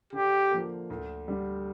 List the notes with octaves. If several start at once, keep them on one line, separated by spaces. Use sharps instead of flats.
D3 G4
F3 A#3
D2
D3 G3